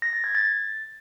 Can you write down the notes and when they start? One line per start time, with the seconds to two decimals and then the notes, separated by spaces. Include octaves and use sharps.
0.02 A#6
0.13 A6
0.24 G#6
0.35 A6